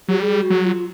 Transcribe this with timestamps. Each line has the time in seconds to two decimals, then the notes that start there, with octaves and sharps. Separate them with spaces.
0.08 F#3 G4
0.20 G3 G#4
0.42 F#4
0.50 F#3
0.65 F4